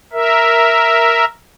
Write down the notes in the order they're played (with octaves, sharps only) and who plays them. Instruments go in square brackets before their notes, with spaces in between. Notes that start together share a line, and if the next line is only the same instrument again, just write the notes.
[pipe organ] A#4 E5